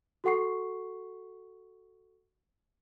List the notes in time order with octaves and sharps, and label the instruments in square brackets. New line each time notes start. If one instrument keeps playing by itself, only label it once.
[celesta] F#4 A4 F#5 C#6 C7